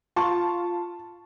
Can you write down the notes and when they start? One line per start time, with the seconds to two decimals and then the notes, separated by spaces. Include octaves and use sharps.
0.16 F4 A5 C#6